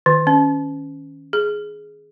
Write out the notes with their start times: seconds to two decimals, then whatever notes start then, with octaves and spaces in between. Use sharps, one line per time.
0.06 D#3
0.27 C#4
1.33 G#4